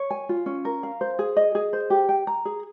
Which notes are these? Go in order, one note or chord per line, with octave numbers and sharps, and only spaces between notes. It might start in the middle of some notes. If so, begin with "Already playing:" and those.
Already playing: C#5
G#5
F4
C#4
A#4
F5
C5
G#4
D#5
G#4
C5
G4
G5
A#5
G#4